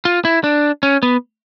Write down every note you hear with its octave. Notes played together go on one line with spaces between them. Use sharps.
F4
E4
D4
C#4
B3